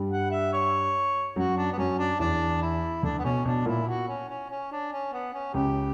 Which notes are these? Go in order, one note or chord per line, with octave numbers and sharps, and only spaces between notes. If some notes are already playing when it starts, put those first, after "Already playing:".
Already playing: G2 G3
F#5
E5
C#5
F#2 F#3 F#4
D4
B3
F#2 F#3 C#4
D4
E2 E3 D4
E4
D2 D3 D4
B3
B2 C#4
B2 D4
A#2 E4
F#4
C#4
C#4
C#4
D4
C#4
B3
C#4
C#2 C#3 G4